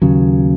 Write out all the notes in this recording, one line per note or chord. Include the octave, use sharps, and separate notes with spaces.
D#2 C#3 F#3